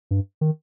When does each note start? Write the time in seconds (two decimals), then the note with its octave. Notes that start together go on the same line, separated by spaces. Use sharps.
0.11 G2
0.41 D#3